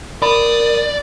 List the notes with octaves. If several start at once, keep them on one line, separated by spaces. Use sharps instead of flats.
A#4 D5 B5 D#6